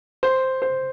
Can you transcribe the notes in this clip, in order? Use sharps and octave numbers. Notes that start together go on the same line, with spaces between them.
C5
C5